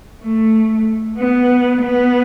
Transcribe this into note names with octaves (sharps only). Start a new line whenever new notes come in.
A3
B3
B3